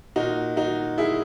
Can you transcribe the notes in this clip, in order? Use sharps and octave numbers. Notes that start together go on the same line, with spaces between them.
A#2 D#4 F#4
D#4 F#4
E4 G#4